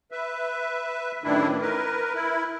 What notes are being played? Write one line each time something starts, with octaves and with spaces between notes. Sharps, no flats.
B4 E5
F#2 A2 D#3 E3 D4 E4
A#4 B4
E4